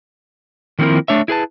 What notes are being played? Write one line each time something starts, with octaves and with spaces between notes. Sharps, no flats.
D#3 F3 A#3 C4 E4 A#4
A3 D4 C#5 E5
E4 G#4 B4 A5